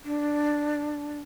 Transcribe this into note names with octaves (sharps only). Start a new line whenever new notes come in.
D4